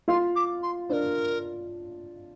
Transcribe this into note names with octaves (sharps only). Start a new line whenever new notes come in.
F4 F5 C6
D6
C6
D4 A#4 C5 D5